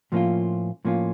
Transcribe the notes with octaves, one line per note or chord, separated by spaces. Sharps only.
A2 F3 A#3 C#4 F4
A2 F3 A#3 C#4 F4